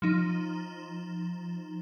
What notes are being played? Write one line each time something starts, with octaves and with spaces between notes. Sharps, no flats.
F3 D#4